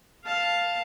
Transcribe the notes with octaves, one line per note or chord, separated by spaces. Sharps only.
F5 A5